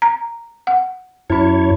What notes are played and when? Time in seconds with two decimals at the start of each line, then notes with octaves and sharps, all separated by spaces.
0.02 A#5
0.67 F#5
1.30 F#2 E4 C#5 B5